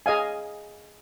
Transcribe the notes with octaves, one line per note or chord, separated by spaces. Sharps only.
G#4 D#5 F5 G#5